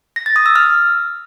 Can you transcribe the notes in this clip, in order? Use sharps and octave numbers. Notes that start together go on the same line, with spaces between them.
A#6
A6
D#6
E6
F6